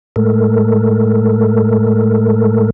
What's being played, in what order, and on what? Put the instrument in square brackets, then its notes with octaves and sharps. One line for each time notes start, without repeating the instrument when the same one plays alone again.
[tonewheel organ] A2 G#3 A3 A4 A#4